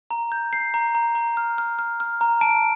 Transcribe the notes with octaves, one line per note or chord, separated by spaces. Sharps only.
A#5
G6
G6 C7
A#5
A#5
A#5
F6
F6
F6
F6
A#5
A5 D7